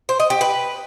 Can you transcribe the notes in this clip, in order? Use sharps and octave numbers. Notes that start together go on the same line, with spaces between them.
C5
D#5
G4
B4